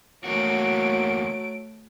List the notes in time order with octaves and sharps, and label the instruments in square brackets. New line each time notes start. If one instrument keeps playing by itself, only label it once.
[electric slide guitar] E2 A#3 F#4 [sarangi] F#3 [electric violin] A3 D7